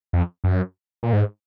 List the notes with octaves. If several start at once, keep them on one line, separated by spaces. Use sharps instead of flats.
F2
F#2
A#2
G#2